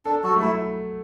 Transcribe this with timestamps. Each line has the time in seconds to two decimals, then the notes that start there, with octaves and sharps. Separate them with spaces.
0.05 D4 A4
0.23 F#3 F#4 A4
0.36 A3
0.42 E4